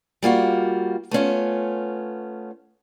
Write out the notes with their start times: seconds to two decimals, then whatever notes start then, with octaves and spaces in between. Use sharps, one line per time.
0.23 G3 A#3 F4 F#4
1.11 A3 B3 C#4 F4